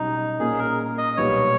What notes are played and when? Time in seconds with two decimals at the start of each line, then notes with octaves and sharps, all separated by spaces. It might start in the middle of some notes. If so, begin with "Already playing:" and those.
Already playing: B1 B2 G3 C#4 D#4
0.39 A#2 A#3 C#4 G#4
0.59 A#4
0.98 D#5
1.17 B1 A#2 G3 B3 C#5